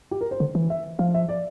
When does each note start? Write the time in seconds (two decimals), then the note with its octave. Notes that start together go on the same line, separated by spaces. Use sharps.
0.11 G4
0.21 A#4
0.31 C5
0.40 D3
0.55 E3
0.70 E5
0.99 F3 F5
1.14 E5
1.29 D5